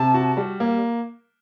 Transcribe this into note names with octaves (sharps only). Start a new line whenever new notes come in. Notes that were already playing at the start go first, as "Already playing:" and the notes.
Already playing: C3 A5
F#4
G3
A#3